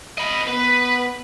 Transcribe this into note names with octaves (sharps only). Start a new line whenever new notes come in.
D#5 B5
B3 B4